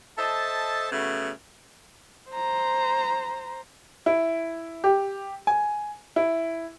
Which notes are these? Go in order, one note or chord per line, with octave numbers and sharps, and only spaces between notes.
A4 C5 D#5 E5 A5
C#3 F#3 A3 B3
C5 A#5
E4
G4
G#5
E4